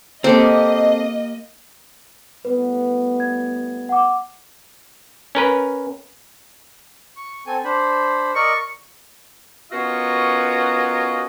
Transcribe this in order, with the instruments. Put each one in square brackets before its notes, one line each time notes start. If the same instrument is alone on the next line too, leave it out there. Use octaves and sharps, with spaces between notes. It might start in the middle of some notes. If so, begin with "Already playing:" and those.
[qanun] A#3 G4 [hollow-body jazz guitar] C4 A4 [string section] D#5
[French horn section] A2 G3 B3 [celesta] B4
[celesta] G#6
F#5 D6
[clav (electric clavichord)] C#4 A#4 B4
[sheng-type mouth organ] C#6
C4 A4 G#5
D4 C5 B5
[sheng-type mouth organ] A#4 D5 D#5 [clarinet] C#6
[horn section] B3 C#4 F4 F#4 A#4 D#5